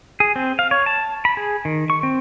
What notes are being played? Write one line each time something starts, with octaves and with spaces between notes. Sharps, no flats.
G#4
C4
F5
C#5
A5
B5
G#4
D#3
C#6
C4